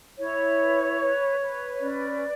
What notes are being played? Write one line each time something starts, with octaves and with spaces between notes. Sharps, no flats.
E4 C#5
B4
B4
B4
C#4 D5